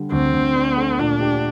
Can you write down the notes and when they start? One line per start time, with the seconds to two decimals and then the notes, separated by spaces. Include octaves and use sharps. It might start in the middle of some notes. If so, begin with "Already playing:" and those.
Already playing: D3 G3
0.12 D2 C4
0.33 D2
0.55 D4
0.77 A3
0.99 A#2 D4
1.21 G4